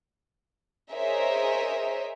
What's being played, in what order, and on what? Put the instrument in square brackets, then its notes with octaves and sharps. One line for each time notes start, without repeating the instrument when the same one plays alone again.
[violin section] G#4 A#4 C5 C#5 D#5 E5